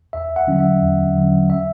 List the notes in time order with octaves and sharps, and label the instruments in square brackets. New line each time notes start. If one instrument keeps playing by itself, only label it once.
[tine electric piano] E2 E5
F#5
D3 F#3 C#4
E5
E2
D3 F#3 C#4
E5